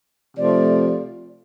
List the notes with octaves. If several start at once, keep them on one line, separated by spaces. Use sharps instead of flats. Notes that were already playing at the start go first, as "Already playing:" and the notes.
C3 F3 A3 D5